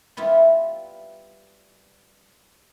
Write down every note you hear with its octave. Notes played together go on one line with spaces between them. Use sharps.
G3 B3 E4 F4